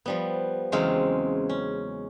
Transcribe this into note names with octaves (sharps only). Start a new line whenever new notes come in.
F3 G3 B3
E2 C#3 F#3 G#3 C4 F5
C#4